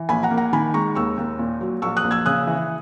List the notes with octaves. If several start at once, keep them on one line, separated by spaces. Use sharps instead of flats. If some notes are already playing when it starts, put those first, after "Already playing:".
Already playing: E3
A#1 G#5 B5
F#5 A#5
A#3
F#5 A#5
D#3 G#5 B5
G#3 A#5 C#6
D#2 C#6 E6
D#2
A#2
F#3
A#1 C#6 E6
D#6 F#6
A#1
E6 G#6
C#3 D#6 F#6
E3